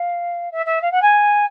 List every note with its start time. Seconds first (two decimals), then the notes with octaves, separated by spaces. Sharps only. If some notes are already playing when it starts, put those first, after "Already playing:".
Already playing: F5
0.51 E5
0.66 E5
0.82 F5
0.91 F#5
1.02 G#5